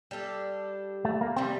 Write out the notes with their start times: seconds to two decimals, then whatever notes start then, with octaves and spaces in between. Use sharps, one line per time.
0.11 G3 D4 A4
1.05 A3
1.21 A#3
1.36 C3 D#3 G3 C4